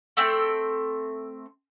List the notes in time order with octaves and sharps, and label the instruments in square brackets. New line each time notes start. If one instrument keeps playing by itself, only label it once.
[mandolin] A3 C4 G5